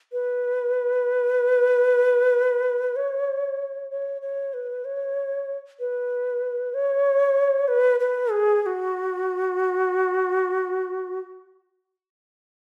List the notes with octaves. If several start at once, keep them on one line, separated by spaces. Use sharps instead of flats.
B4
C#5
C#5
C#5
B4
C#5
B4
C#5
B4
B4
G#4
G#4
F#4